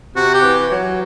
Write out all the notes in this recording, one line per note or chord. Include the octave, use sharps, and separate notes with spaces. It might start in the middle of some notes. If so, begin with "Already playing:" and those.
C3 F#4
G4
E3
F#3